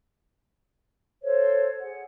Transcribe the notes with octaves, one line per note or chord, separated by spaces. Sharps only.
A4 C5 C#5
G#4 F#5